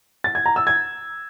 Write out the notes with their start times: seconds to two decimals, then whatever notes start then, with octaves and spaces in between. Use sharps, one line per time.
0.24 A6
0.35 G#6
0.46 A#5
0.56 E6
0.67 G#6